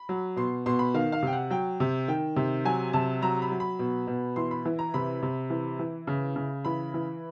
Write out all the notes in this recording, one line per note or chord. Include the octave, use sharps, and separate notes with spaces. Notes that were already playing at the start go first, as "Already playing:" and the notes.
Already playing: B5
F#3
B2 C6
B2 C6
B5
D#3 F5
F5
C3 G5
F#5
F#3 G5
C3
D#3 G5
C3
F#3 G#5
C3 A5
F#3 A#5
B5
F#3
B5
B2
B2
E3 C6
B5
E3
A#5
C3 B5
C3
E3
E3
C#3
C#3
E3 B5
E3